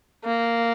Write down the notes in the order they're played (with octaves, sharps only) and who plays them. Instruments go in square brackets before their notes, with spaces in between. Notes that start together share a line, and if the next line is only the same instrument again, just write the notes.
[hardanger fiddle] A#3